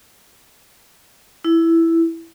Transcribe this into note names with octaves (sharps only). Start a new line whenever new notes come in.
E4